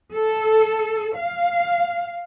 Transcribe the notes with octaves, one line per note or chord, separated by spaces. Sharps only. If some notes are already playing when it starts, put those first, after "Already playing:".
A4
F5